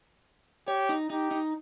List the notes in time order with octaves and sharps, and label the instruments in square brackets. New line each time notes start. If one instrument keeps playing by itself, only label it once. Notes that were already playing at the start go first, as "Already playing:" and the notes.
[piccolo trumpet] G4 [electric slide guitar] C#5
[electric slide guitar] D#4
[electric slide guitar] D#4 [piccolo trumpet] G4
[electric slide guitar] D#4